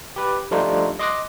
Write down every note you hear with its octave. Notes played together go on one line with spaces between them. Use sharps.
G4 B4
F3 G3 A3 D4 D#4 F4
D#5 C6 D6 D#6 F#6 A#6